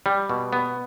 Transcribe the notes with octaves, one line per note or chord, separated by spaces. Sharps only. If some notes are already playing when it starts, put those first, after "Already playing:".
G3
B2
B3